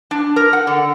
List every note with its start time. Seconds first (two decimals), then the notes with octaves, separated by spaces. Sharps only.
0.11 D4
0.36 A#4
0.53 F#5
0.67 D3